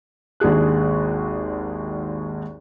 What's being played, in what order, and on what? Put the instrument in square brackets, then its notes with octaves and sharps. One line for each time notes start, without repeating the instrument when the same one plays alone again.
[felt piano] G#1 D#2 D4 G#4 F#6